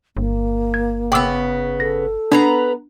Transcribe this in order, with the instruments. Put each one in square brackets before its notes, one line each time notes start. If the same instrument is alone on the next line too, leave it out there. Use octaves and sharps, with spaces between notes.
[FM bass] G1 [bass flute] A#3
[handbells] G#6
[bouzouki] C#3 B3 [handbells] G5 D6 E6
[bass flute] A4 [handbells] A#6
[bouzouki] B3 B4 A#5 [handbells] D4 G#6 C7